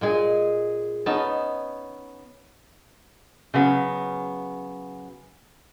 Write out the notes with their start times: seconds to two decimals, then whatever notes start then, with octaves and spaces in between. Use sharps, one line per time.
0.01 A#2 G#3 G#4
1.06 B3 C#4 D#4 A5
3.54 C#3 F#3 B3